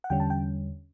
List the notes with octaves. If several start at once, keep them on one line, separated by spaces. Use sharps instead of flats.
F#5
E2 D3 G3 C#4 G5
A5
G5